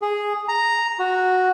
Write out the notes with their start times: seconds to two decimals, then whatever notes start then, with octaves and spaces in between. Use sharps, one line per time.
0.02 G#4
0.48 A#5
0.99 F#4